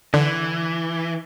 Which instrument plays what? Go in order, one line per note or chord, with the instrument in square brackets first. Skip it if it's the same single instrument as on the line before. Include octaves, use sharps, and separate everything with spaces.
[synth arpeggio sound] D3 [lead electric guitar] E3